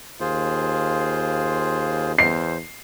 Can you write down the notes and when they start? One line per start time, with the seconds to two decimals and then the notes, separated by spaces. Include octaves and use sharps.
0.20 D#2 F4 G#4 C5
2.19 E2 C5 C7